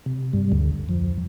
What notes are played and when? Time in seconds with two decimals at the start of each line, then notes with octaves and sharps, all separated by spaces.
0.06 C3
0.33 G2 G3
0.52 D2 D3
0.89 F2 F3